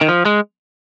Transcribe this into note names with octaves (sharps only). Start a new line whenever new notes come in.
D#3
F3
G#3